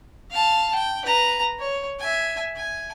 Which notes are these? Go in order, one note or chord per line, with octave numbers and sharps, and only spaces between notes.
F5 A5
G5
B4 A#5
C#5
E5 G#5
G#5